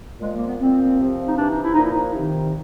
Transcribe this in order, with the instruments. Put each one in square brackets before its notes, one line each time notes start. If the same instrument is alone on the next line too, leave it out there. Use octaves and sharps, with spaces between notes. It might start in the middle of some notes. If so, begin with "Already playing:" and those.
[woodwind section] A#2 F3 G#3
A#3
B3
A#2 F3 C4
C3 F3
D#4
C3 E3 D4
D#4
E4
A#2 F3 D#4
E4
D#4
C3 D#3